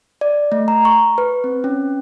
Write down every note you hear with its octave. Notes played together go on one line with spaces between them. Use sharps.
D5
A3
A#5
C#6
B4
C4
C#4